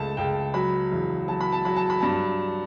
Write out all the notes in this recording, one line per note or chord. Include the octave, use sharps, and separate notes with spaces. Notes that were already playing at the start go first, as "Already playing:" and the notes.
Already playing: C#2 A3 A5
C#2 G5
F#3 B5
E2
F#3 A5
B5
A5
F#3 B5
A5
B5
G2 A5